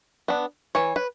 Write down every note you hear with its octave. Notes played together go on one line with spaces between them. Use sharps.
B3 D4
E3 C#5
B4